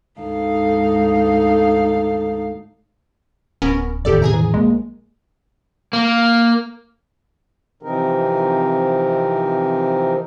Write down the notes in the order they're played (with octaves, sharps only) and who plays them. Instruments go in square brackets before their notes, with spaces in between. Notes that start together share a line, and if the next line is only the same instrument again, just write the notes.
[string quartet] D2 G#2 D#4 A4 F5
[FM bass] D1 [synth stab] B3 C#4 A#4
[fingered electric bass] E2 A2 D#3 [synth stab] G4 A4 D5
[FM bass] C3 [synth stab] G#4 G#5 A#5
[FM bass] E3
[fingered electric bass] B1 A#3 [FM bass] G#3
[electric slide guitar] A#3
[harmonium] C3 E3 F3 C4 D#4 A#4